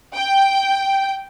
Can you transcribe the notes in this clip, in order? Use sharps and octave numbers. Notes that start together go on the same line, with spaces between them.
G5